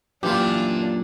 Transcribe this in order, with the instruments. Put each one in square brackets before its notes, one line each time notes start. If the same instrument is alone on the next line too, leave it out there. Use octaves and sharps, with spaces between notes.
[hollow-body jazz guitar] F#2 A#2 [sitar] E3 A#3 [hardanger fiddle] D4 [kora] F4 G4